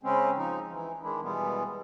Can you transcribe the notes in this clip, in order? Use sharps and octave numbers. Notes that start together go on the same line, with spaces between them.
C#3 G#3 C4 C#4
F3 D#4
E3
D#3 G#3 D4 E4
B2 E3 G3 G#3 B3